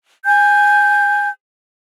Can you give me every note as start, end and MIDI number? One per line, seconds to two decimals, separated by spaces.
0.25 1.29 80
0.25 1.29 91